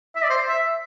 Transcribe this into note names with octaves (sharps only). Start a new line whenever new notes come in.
E5
D5
C5
E5